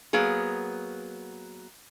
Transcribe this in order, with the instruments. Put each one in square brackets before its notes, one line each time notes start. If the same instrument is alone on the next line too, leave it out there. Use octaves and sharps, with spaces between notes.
[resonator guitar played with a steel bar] F#3 A#3 B3 G#4